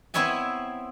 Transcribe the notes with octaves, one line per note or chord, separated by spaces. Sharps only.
B3 C4 E4 C#5 E5 G#5